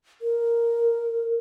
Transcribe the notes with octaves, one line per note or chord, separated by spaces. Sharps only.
A#4